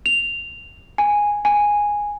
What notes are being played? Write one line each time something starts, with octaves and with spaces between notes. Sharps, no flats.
F7
G#5
G#5